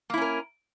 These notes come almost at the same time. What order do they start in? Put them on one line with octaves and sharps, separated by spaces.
A#3 E4 C#4 A#4